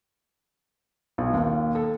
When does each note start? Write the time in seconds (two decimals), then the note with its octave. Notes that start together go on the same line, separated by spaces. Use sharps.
1.18 B1
1.33 D#2
1.75 A4